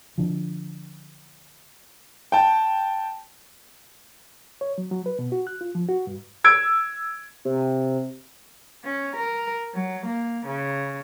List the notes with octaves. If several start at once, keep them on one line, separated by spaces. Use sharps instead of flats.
D3 F3
G5 A5
C#5
F#3
F#3
B4
B2
F#4
F#6
F4
F3
F#4
G2
E6 G#6 D7
C3
C#4
A#4
F#3
A#3
C#3